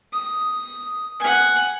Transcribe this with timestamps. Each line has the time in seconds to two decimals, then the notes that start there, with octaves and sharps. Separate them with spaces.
0.13 D#6
1.19 F#5 G#5